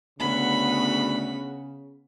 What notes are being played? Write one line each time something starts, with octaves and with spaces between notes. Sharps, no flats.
D2 C#3 B3 F#4 B5